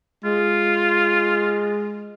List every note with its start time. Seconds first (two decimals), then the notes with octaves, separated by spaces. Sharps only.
0.25 G#3 F4